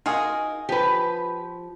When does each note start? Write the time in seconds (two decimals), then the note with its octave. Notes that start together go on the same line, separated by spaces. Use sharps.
0.06 D#4 F4 F#4 G#4 A#4
0.69 F3 G4 B4